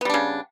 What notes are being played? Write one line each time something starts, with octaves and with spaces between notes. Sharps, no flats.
C#3 G3 B3 D4